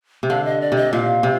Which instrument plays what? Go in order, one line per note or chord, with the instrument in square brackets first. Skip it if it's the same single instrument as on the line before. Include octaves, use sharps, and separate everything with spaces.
[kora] C3
[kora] D3 [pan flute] F5
[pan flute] D#5
D5
[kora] C3 [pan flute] D#5
[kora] A#2 [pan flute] F5
[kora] C3